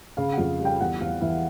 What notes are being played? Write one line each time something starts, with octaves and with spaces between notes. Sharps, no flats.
C#3 F5
F2 F#5
G3
G5
E2 F#5
E2 F5
E3 E5